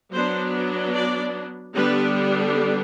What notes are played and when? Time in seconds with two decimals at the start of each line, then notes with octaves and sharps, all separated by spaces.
0.12 F#3 B3 D4 C5
0.94 D5
1.74 D3 G3 B3 D4 B4